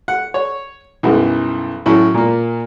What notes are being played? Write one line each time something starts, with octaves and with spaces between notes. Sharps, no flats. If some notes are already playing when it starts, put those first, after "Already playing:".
F#5
C#5
B1 F#2 E3 G3
A2 F#3 C#4 E4
A#2 A#3